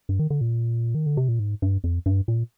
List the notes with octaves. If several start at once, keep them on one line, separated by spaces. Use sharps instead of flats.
G2
D#3
D3
A#2
D#3
D3
C3
A#2
G#2
G2
F2
G2
A#2